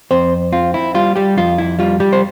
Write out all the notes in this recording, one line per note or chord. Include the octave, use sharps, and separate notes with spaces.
F2 C4 C5
C4 F4
E4
G3 F4
G3 G4
F2 F4
E4
G3 F4
G3 G4
C5